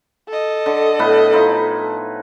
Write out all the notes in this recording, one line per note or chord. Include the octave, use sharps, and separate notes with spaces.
A4 D#5
D3
A2 B3 B5
F3 D#4 E4